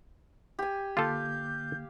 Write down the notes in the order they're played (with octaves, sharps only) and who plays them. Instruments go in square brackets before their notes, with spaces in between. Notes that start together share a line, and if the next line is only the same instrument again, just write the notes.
[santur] G4 G#5
[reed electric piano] D3 A#3 D6 [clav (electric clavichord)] F4 A4 [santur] F5 [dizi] G6